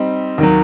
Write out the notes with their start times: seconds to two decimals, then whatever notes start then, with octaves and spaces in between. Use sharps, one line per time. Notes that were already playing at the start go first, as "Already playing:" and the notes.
Already playing: G3 C4 D#4
0.38 D#2 D#3 F#3